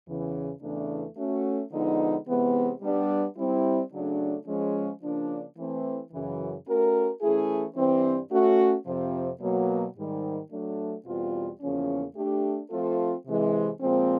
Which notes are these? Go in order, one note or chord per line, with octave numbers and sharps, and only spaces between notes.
E2 C#3 E3
E2 C#3 E3 A3 D4
A3 C#4 F#4
D3 F3 G#3 B3 D#4
C3 E3 G#3 B3
G3 B3 D4
G3 C4 E4
C#3 F#3 A3 D4
F3 G#3 C#4
C#3 F3 A#3 D4
E3 A3 C4
F#2 C#3 E3
A3 C#4 F#4 A#4
E3 A3 C#4 E4 G#4
G2 E3 G3 C4
A3 C#4 F#4
F2 C3 F3
B2 F#3 A#3
G#2 D#3 G3
F#3 A3 D4
E2 B2 G3 C4 F4
E2 C#3 F3 A#3 C#4
A3 D4 G4
F3 A3 C4 F4 A4
C3 E3 G#3
A#2 F3 G#3 C4